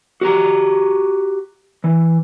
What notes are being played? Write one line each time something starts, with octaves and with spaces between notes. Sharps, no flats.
F#4 G4 A#5
E3